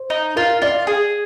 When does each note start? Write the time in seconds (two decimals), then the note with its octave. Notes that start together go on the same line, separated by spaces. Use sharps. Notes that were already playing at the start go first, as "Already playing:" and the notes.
Already playing: C5
0.10 D#4
0.36 F4 A#4
0.62 F4 D5
0.87 G#4